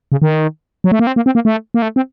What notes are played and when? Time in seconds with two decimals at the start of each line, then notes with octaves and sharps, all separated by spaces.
0.12 C#3
0.22 D#3
0.84 F#3
0.92 A3
0.99 A#3
1.07 C4
1.16 A#3
1.26 C4
1.35 A#3
1.45 A3
1.74 A#3
1.82 A3
1.96 C4